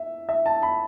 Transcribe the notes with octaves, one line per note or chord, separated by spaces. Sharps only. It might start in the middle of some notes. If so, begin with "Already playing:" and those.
Already playing: E5
E5
A5
B5